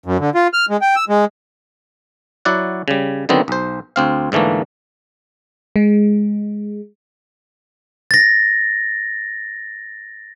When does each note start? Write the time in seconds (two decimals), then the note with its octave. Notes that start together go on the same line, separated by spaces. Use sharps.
0.06 F#2
0.19 D3
0.35 F4
0.53 F6
0.70 G#3
0.81 G5
0.96 E6
1.09 G#3
2.45 F#3 E4 D5 F#5
2.88 C#3 G3
3.29 D3 D#3 F#3 B3 C4
3.48 B1 C5
3.96 D2 C4 F5
4.32 G#2 D3 E3 A3 A#3
5.76 G#3
8.11 A6 A#6